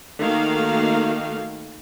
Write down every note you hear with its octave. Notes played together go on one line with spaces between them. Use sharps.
D#3 A3 A#3 F#4 F5